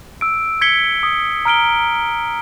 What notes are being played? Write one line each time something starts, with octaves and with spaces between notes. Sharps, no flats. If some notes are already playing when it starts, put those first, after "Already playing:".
E6 D7
G#6 B6 C#7 G7
D#6
A#5 F6 D7 G7